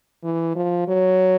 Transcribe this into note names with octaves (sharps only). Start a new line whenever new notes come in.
E3
F3
F#3